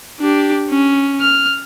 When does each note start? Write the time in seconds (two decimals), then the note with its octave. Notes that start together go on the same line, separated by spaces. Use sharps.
0.20 D4 G4
0.70 C#4
1.21 F6